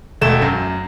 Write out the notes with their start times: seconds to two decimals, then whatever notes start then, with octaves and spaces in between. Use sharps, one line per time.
0.21 E1 A3 E7
0.42 F#2